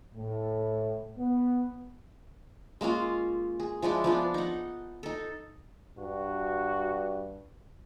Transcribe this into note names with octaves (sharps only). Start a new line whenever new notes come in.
A2
B3
G#3 A#3 C#4 F4
G#4
F3 G#3 D4 E4
F3 B3 D4
D#4 F#5
D#4 A4
G2 F#4